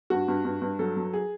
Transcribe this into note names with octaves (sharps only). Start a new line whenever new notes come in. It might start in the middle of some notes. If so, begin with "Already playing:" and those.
G2 F#4
G2
G2
G2
F#3 A4
F#3
G#4